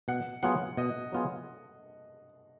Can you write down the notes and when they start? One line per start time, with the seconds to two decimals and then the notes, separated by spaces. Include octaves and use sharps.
0.08 B2 F#5
0.43 F#3 B3 F4 G#4 F#5
0.77 B2 D#5
1.12 F#3 B3 F4 G#4